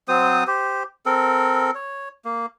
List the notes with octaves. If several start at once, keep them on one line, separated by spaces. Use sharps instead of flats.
F#3 C4 C5 D#6
G4 C5
C4 A4 A#4
C#5
A#3